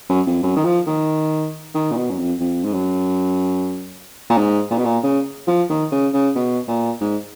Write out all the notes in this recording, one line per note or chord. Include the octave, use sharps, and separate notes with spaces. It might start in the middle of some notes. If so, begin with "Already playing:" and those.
F#2
F2
F#2
D#3
F3
D#3
D#3
A#2
B2
F#2
F2
F2
G#2
F#2
A#2
G#2
A#2
B2
A#2
C#3
F3
D#3
C#3
C#3
B2
A#2
G#2